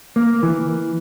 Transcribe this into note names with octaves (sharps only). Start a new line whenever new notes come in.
A#3
E3